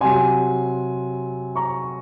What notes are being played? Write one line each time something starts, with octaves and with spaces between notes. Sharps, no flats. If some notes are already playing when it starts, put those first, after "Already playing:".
C3 F#3 G#5 C6
A#5 C#6